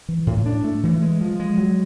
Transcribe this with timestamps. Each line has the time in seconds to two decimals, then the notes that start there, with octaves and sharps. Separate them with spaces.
0.09 E3
0.27 A2
0.46 D4
0.64 A3
0.83 E3
1.02 G#3
1.21 F3
1.40 G#3
1.58 F#3